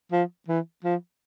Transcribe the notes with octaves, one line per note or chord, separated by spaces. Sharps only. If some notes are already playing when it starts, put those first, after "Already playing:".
F3
E3
F3